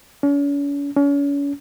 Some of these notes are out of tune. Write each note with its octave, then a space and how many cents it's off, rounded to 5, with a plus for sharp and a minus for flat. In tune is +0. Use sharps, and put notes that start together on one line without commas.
C#4 +40
C#4 +35